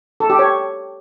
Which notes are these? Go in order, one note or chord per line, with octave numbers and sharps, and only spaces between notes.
A4
G4
C#5